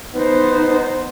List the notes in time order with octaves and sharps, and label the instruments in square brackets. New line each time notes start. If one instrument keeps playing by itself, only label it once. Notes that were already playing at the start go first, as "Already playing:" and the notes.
[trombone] B3 [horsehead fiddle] D#4 C5